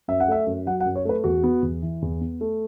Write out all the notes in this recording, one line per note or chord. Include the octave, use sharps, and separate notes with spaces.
F#2 E5
F#5
A3 E5
F#2
F#3 F#5
F#5
F#2
C#5
A3 B4
E2 F#4
B3
E2
E3
E2
B3
A3